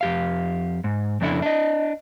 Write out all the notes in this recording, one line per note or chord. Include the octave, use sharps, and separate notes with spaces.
F2 G4 F5
G#2
F2 C#3 D4 E4 A4 E5
D4 D#5